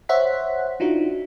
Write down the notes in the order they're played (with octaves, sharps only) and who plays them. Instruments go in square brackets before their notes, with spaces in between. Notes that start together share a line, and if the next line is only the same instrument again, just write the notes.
[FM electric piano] C5 C#5 E5 F#5 F#6 B6
D4 D#4 F4 F#4